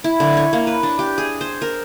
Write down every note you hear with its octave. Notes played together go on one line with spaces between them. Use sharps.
E4
D3
C#5
A#3
B4
D4
G4
G#4
C5
A#4